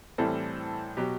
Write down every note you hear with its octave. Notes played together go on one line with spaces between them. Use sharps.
A2 E3 G3 C4 E4 A4
B2 F#3 G4